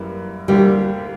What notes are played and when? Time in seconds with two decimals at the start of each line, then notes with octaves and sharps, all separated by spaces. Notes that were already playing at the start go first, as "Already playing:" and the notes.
Already playing: F#2 E3 G3 A#3 E4
0.48 D2 D3 G3 A#3 E4 G4